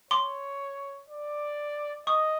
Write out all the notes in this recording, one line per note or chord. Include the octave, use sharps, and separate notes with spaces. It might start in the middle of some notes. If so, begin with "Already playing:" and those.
C#5 C6 D6
D5
D#5 C#6 D#6